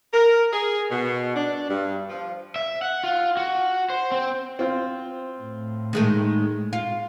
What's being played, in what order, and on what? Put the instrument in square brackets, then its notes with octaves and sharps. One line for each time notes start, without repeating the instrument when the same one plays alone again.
[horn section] A#4
G#4
B2
D4
G2
F3
[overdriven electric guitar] E5
F#5
F4
F#4
C5
C4
[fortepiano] C4 F4 C5
[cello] A2
[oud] D#3 G#3 A3
F4